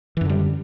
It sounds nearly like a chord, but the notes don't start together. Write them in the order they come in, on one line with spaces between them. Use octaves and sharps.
E3 F#2 D3 G3